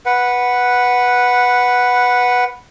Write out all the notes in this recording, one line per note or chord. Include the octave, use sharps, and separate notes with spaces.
B4 F#5